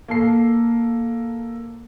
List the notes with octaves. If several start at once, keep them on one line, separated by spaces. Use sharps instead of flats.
A#3 A4 C7